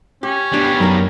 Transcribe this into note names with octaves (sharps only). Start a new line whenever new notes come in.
C#4 G4
B2 G3 D4 G4
F#2 D#4 A#4